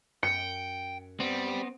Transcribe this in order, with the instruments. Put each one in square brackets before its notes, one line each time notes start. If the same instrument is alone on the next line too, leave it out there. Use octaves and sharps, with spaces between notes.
[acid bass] F#2 [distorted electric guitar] G5 [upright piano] C#7
[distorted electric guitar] G3 [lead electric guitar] B3 C4